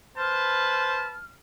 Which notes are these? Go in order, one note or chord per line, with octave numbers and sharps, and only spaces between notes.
B4 C5 A5 F6